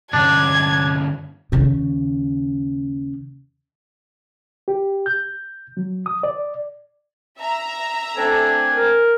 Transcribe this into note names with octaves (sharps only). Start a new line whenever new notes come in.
G2 D3 C#4 D4 G#6
D#2 C#3
G4
G6
F#3
D#6
D5
E5 A#5
A3 C4 D4 A4 G#5
A#4